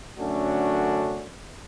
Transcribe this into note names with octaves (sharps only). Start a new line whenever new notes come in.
F#2 D3 A3 C#4 D4 F#4